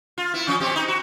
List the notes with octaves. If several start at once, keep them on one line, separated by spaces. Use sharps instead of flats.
F4
B3 E4
F3 C#4
B2 C4 G4
D#4
F#4